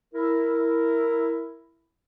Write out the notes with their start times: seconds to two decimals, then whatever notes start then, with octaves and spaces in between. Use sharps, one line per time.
0.14 E4 A#4